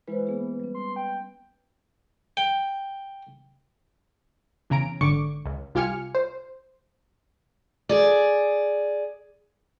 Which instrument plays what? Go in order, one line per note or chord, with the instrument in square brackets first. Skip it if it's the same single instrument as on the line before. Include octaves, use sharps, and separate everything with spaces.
[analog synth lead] E3 [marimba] G#3 E4 C5 [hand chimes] B4
[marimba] A#3 B3 G#4
G3 C#4
[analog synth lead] C6
G5
[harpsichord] G5
[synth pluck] E2 C#3 C#4 A#5 D7
G#1 D3 C#6 D6 C#7
C#2
C2 F4 G4 G#5 F6 C#7
C5
[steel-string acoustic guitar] G#4 D5